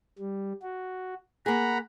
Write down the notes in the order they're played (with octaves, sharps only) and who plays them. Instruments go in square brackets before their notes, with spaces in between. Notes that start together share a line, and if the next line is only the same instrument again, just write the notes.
[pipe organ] G3
F#4
[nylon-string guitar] A#3 G#4 [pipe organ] F#5 A#5 B5